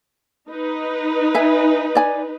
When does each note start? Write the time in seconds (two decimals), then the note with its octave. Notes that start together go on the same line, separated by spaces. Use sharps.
0.49 D#4 B4
1.35 E5 G#5
1.95 D5 G#5